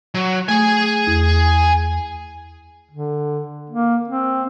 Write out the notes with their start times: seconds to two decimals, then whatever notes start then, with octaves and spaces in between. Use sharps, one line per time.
0.15 F#3
0.48 A3 G#4 G#5
1.07 E2
2.91 D3
3.70 A#3
4.08 C4